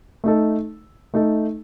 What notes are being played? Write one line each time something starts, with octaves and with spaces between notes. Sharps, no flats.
A3 D#4 A4
A3 D#4 A4